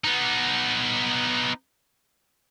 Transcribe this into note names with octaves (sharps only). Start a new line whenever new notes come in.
B3 D#4